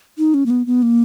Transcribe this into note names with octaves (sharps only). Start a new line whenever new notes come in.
D#4
C#4
A#3
B3
B3
A#3